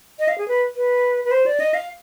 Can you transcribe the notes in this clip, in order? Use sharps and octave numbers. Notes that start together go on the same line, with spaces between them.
D#5
F5
G#4
B4
B4
B4
C5
D5
D#5
F5